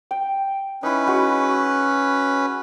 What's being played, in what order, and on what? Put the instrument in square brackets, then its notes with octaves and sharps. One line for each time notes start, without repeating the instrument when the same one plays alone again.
[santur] G5
[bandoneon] C#4 B4 [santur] D#4 E4
[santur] G#3 F#4